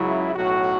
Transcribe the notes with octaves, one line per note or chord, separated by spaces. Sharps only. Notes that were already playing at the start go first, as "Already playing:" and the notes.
Already playing: C#2 C#3 F#3 E4
B1 A2 F#3 F#4